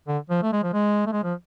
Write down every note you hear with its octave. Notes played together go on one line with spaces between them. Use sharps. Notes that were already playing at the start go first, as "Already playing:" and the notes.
D3
F3
A3
G#3
F3
G#3
A3
G#3
F3